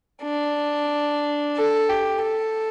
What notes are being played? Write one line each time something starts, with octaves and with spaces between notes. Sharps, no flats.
D4
A4
G4
A4